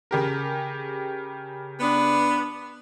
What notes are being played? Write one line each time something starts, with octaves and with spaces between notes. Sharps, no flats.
C#3 G4 A#4
B3 D4